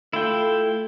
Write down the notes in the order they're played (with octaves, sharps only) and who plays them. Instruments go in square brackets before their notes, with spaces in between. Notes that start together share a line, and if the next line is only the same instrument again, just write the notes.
[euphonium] A3 [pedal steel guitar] E4 F4 G5